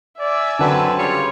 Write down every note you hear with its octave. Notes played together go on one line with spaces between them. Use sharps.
D5 E5 G#5
F#2 D3 C4 B4 F#5 A5
C#3 G3 F4 C#5